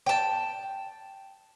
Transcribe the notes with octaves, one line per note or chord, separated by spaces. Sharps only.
G5 A5